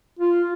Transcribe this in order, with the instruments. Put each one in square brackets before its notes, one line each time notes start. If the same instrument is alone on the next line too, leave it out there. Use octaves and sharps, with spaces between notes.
[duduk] F4